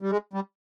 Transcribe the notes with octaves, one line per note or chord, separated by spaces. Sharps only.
G3
G#3
G3